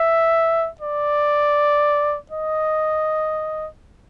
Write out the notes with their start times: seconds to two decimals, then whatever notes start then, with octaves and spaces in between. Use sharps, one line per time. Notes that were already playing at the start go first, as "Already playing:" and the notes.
Already playing: E5
0.81 D5
2.31 D#5